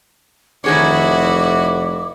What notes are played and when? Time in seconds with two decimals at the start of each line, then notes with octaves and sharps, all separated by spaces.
0.64 F1 D#3 E4 F#4 G#4 C#5 D6